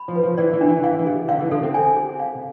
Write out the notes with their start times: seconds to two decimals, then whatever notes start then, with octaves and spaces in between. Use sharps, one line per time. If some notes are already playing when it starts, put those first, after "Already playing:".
Already playing: B5
0.08 F3
0.15 B4
0.23 F3
0.37 E3 D5
0.53 E3
0.61 D4
0.69 E3
0.83 E3 F5
0.99 E3
1.07 G#4
1.28 D3 F5
1.41 E3
1.51 D3 A4
1.63 C4
1.74 G#5
1.96 G#4
2.20 F5